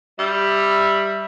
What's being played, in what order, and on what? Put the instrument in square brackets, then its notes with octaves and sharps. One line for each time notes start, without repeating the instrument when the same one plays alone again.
[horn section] G3 E5